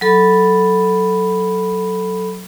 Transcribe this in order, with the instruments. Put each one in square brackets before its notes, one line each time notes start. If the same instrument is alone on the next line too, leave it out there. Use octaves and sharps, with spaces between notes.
[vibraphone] F#3 A4 B5